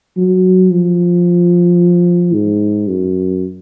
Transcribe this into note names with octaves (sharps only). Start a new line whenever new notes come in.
F#3
F3
G#2
F#2